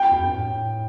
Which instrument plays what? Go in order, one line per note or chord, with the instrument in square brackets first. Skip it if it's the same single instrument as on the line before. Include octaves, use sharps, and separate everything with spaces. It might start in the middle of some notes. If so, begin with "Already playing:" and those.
Already playing: [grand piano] G5
[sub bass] E2
F2
G2
A2